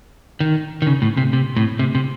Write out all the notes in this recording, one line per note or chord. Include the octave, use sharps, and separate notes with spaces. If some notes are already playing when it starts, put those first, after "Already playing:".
D#3
D#3
C#3
A2
C3
C3
A2
C3
C3